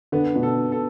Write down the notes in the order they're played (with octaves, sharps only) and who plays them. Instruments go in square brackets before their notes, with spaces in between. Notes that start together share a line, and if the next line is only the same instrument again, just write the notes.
[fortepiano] D3 [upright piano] B3
[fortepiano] B2
[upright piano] A4
A4